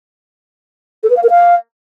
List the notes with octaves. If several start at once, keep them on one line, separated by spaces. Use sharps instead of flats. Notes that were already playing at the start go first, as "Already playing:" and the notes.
A4
B4
F5
A#4
F5